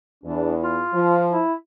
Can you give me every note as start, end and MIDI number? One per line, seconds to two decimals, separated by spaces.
0.24 0.80 40
0.24 0.53 62
0.63 1.22 65
0.94 1.40 53
1.31 1.53 64